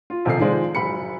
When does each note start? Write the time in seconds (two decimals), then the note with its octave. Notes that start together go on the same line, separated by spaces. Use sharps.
0.10 F4
0.25 A#1 C3 D#3 D#4 A4 C7
0.40 D#3 F3 G#3 C5 D5
0.75 F#1 B5 C#7